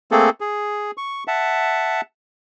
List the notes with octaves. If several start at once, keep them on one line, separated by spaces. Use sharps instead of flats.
A3 A#3 C4 G#4 A4
G#4
C#6
E5 F#5 A5